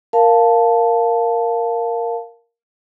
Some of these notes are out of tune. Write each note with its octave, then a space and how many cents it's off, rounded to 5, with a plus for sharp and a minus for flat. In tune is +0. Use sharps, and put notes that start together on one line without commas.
A#4 +0 F5 +0 A5 +0